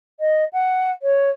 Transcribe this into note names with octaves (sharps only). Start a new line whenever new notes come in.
D#5
F#5
C#5